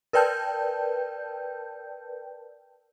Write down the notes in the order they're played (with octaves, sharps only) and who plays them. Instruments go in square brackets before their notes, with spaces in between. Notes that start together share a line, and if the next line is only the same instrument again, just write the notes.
[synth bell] A#4 B4 D5 G5 A5 G6